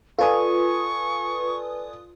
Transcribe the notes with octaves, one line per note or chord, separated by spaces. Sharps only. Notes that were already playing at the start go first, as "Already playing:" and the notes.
F4 A4 B4 D5 G#5 C#6 D#6